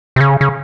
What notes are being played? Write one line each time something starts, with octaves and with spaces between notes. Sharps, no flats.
C3
C#3
C#3